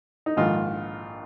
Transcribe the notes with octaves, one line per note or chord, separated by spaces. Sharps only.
D#4
A#1 G#2 D#3 F4